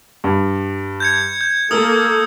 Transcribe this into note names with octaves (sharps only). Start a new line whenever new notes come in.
G2
G6 G#6 C#7
G6
A#3 A4 A#4 D#6 E6